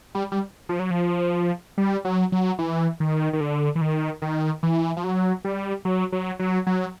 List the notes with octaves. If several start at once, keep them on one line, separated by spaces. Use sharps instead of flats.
G3
G3
F3
F#3
F3
G3
F#3
F#3
E3
D#3
D#3
D3
E3
D#3
D#3
E3
F3
F#3
G3
F#3
F#3
F#3
F#3